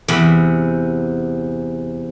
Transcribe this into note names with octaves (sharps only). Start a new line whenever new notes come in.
E2 C3 B5